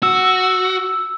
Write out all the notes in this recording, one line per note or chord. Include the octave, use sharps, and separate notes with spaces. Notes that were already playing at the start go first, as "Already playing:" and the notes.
F#4 E6